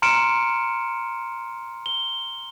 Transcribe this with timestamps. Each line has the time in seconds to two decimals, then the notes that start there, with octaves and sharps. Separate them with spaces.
0.02 A#5 C6 F6 C#7 D7 E7
1.86 G7